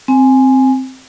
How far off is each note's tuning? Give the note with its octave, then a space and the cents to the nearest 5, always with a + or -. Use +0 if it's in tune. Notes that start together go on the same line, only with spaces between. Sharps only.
C4 +0 G#5 +0